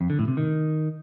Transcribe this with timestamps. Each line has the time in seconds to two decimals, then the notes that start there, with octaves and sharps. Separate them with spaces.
0.01 F2
0.10 D3
0.19 A2
0.28 C3
0.37 D#3